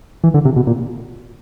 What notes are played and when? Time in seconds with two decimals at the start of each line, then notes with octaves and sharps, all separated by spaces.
0.24 E3
0.34 D3
0.45 C3
0.56 B2
0.67 A#2